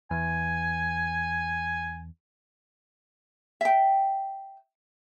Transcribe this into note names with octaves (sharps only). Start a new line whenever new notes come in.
E2 G#5
E5 G5